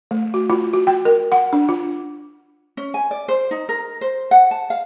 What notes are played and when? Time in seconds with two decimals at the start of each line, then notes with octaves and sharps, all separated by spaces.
0.11 A3
0.34 F#4
0.50 F4
0.73 F#4
0.87 G5
1.05 A#4
1.32 F#5
1.53 D4
1.69 F4
2.77 C#4
2.94 G#5
3.11 D5
3.28 C5
3.51 D#4
3.69 A#4
4.01 C5
4.31 F#5
4.51 A5
4.70 F5